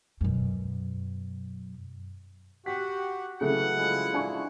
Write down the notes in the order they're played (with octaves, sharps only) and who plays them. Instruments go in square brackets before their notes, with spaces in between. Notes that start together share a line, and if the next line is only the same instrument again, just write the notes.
[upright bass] F#2 B2
[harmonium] F#4 G4 F#5 [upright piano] B6
[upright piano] C#3 F#3 A3 [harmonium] E3 [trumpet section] F#5
[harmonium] F3 G#3 E4
[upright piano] D4 G#5 C#6